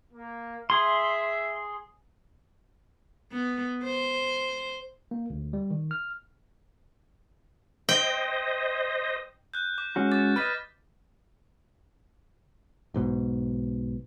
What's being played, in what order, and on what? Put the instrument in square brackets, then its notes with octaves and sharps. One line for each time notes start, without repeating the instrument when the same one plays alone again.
[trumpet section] A#3
[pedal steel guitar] G#4 C6 [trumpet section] E5
[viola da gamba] B3
C5
[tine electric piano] A#3
D2
G3
D#3
F6
[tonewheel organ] C5 D#5 [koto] G5
[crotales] F#6 G6
D6
[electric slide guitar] G#3 C#4 F#4
[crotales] D6 A6
[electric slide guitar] B4 D5 D#5 [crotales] F6 A6 B6
[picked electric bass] B1 G#2 B2